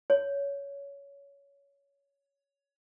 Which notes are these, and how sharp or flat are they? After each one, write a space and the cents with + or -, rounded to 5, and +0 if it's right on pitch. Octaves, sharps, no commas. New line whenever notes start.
C#5 +15